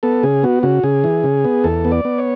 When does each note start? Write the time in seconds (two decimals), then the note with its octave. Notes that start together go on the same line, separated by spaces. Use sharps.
0.03 B3 A4
0.23 C#3 G#4
0.43 B3 F#4
0.63 C#3 F#4
0.83 C#3 G#4
1.04 E3
1.24 C#3
1.44 B3
1.64 E2 A4
1.85 B3
1.92 D5
2.05 B3
2.18 C#5